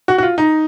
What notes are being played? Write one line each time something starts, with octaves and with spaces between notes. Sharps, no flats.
F#4
F#4
F4
D#4